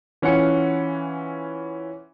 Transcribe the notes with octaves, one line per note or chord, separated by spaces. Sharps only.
E3 C#4 F4 F#5 C#7